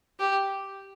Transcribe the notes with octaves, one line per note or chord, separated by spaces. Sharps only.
G4